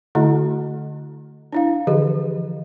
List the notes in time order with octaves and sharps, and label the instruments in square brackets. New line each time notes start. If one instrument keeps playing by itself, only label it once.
[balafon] D3 A3 E4 F#4 D#5 F#5
D4 E4 F5
D3 E3 F3 G4 G#4 D#5